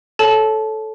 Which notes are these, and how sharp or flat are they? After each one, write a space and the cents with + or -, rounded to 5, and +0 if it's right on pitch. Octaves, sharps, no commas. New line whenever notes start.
A4 -10 C#5 +0 A5 -20